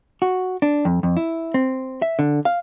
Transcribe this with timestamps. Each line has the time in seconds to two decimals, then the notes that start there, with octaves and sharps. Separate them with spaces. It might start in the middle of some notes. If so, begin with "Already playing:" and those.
0.22 F#4
0.62 D4
0.85 F2
1.03 F2
1.17 E4
1.54 C4
2.02 E5
2.19 D3
2.45 F5